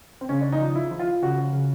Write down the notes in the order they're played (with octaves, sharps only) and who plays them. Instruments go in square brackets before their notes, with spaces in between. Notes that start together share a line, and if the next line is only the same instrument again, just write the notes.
[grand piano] C4
C#3 C#4
D4
D#4
F3
E4
F3
F4
C#3 F#4
C#3